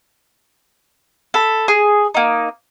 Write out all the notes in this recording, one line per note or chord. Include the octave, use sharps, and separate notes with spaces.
A4 B5
G#4
A#3 D#4